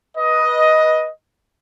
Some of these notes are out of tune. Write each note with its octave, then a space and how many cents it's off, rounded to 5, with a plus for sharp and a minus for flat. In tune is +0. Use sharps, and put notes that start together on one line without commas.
B4 -20 D#5 +10